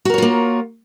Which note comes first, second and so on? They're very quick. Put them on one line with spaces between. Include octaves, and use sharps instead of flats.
F#4 A#4 C#5 F4 A#3